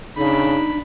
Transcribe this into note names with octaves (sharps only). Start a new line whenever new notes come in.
C#3 D4 D#4 B5